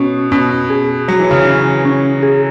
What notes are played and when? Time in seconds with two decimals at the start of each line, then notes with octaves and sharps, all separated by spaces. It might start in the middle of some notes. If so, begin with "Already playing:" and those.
Already playing: B2 C#4
0.32 B2 C#4
0.70 G#4
1.08 F#3 C#5
1.19 E3
1.31 C#3
1.42 E3
1.47 C#4
1.85 C#4
2.22 G#4